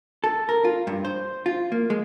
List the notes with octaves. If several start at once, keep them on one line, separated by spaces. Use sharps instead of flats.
A4
A#4
F4
G2
C5
F4
A#3
G#3